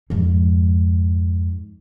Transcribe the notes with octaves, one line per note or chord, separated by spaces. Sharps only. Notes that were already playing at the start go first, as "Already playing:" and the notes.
F2 G#2